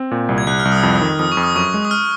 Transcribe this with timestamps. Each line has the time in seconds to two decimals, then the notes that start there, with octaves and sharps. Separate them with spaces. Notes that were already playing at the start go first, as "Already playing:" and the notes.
Already playing: C4
0.11 A#2
0.29 C2
0.38 G#6
0.47 C2 F#6
0.60 F6
0.65 C2
0.72 D#6
0.83 F2
0.95 D#6
1.01 D#3
1.19 F2 D#6
1.32 C#6
1.37 F2
1.43 D#6
1.56 F#2 C#6
1.74 G#3
1.85 D#6
1.91 F6